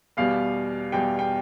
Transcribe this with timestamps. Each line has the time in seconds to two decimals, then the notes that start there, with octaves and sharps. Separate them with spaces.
0.17 E2 B2 G3 F5
0.92 E2 B2 G3 G5
1.19 G5